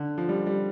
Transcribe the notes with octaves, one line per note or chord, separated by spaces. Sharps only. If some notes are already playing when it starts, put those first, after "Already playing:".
Already playing: D3
F3
G3
G3